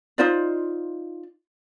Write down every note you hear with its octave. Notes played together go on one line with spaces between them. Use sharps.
D#4 F4 C5 D5